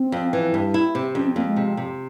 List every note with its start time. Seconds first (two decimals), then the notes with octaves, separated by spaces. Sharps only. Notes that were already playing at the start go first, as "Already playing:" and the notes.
Already playing: C4
0.12 F2
0.33 E3
0.54 G2
0.74 E4
0.95 C3
1.15 F2 C#4
1.26 C4
1.36 F2 A#3
1.46 G#3
1.56 C3
1.77 C3